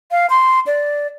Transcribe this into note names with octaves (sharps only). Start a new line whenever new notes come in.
F5
C6
D5